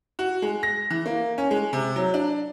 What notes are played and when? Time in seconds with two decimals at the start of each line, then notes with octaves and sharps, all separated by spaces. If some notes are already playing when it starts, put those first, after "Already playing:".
0.19 F#4
0.42 G#3
0.63 A#6
0.91 E3
1.06 A#3
1.38 C#4
1.51 G#3
1.73 C3
1.96 F#3
2.14 D4